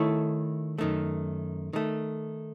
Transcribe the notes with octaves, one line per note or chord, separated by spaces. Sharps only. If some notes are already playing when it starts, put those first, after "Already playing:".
Already playing: D#3 A3 E4 A4 C#5
F#2 D#3 A3
D#3 A3